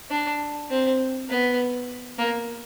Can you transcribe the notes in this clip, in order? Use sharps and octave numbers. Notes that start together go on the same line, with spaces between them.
D4
C4
B3
A#3